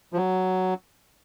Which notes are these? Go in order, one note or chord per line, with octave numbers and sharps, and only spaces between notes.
F3
F#3